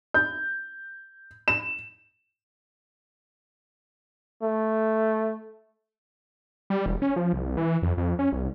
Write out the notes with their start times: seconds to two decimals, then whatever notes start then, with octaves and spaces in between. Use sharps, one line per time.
0.14 G6
1.48 E7
4.43 A3
6.70 G3
6.86 E1
7.02 C#4
7.16 F3
7.33 C2
7.57 E3
7.82 F2
7.97 F2
8.19 C#4
8.32 C2